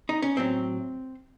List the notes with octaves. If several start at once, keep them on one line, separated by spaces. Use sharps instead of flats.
D#4
C#4
A2 F#3 C4